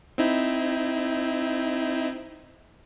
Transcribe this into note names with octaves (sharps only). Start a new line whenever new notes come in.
C4 D#4 E4